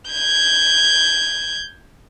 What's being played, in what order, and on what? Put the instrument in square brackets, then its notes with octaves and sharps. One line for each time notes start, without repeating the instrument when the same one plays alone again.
[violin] G6 G#6